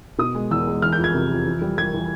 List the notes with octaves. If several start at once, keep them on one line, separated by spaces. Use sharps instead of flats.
B2 D#6
G#3
E2 E6
G#3
E3 F6
G6
F2
G#6
C3
F2
E3
G3
G3 G#6
E3